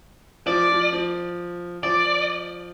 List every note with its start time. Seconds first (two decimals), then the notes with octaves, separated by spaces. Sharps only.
0.46 F3 D5
0.69 F3
0.93 F3
1.83 F3 D5